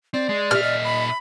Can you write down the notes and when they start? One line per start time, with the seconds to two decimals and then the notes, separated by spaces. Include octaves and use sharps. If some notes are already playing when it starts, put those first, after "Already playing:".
0.14 C4 D5
0.29 G#3
0.51 A#2 G4 E5 F6
0.63 D#5
0.84 B5